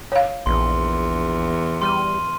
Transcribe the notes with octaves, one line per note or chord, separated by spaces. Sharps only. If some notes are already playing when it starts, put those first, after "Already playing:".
C#5 F5
A#1 E2 C6
G3 C6 F6 D#7